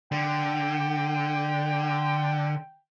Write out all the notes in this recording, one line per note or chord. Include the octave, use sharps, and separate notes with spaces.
D3 G5